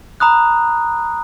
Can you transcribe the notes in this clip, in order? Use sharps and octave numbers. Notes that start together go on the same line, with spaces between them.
A#5 B5 D#6 F#6